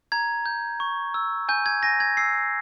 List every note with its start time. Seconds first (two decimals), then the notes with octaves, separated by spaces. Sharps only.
0.12 A#5 G#6
0.46 G6
0.80 C#6
1.14 E6
1.49 G#5 G6
1.66 G#6
1.83 G#5 A#6
2.00 G#6
2.17 E6 C7